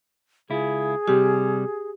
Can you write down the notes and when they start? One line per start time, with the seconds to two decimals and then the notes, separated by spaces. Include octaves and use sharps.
0.50 C#2 E4 F4 G#4
1.08 C3 G3 G4